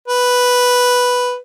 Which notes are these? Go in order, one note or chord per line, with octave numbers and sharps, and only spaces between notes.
B4